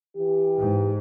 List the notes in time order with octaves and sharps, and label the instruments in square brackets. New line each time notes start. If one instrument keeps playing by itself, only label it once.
[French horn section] E3 G4
[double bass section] G#2